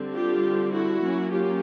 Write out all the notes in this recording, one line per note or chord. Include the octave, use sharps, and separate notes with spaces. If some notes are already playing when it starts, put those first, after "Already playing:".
Already playing: D3 G3 C4
F4 G4
E4 F#4
F#3 A#3 C#4
F4 G4